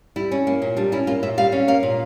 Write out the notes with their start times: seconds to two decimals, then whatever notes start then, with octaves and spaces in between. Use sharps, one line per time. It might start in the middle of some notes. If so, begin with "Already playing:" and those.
0.16 G3 E4
0.31 C#4
0.47 A#3
0.62 A#2
0.77 G3 D4
0.92 C#4 E4
1.07 A#3 F4
1.23 A#2 E5
1.38 G3 F5
1.52 C#4
1.68 A#3 F5
1.83 A#2